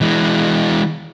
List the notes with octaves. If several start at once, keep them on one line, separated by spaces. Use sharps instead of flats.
E3 G#3